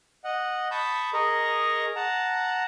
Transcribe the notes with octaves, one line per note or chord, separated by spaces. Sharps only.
D#5 F#5
A5 B5 C#6 D#6 G6
G#4 A#4 D#5 A#5 C#6
F#5 A5 A#5